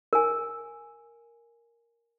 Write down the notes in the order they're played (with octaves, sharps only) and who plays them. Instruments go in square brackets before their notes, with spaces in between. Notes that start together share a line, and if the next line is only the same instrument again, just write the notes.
[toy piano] A#4 G#5